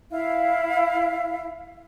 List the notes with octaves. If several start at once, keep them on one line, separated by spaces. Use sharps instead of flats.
E4 F5